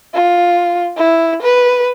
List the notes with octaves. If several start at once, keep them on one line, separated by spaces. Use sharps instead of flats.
F4
E4
B4